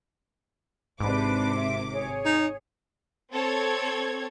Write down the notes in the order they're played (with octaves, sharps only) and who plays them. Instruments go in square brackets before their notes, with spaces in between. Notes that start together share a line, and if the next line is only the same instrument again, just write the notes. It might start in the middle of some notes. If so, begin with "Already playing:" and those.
[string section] G#1 C3 D6 [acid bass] G#2 [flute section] D4 B4
[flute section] E5
G#4 C#5
[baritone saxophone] D#4
[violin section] C4 A4 C#5 G#6